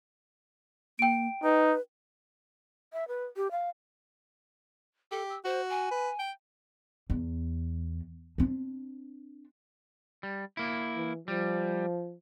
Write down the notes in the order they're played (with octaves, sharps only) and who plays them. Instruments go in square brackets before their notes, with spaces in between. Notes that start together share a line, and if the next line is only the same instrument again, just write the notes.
[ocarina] A#3 [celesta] G5 D7
[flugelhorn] D#4 [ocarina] B4
[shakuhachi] E5
B4
G4
F5
[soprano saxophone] G4 [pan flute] A4
[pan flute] E6
[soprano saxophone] F#4 [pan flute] C5
[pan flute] G#5
[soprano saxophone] B4
G5
[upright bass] E2
C4 D4
[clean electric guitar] G3
A#3 E4
[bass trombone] E3
[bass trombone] F3 [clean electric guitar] G3